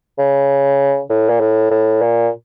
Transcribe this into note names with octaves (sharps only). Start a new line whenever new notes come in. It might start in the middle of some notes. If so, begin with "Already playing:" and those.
C#3
A2
A#2
A2
A2
A#2